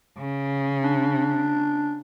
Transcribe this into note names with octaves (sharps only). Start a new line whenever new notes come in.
C#3
D4